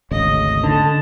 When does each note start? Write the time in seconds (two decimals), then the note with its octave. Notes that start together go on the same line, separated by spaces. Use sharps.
0.11 G#1 D2 C#3 D#5
0.64 D3 A5